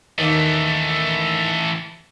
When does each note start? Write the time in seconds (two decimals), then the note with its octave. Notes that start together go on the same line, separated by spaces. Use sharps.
0.19 D#2 D#3 E3 A3 A#3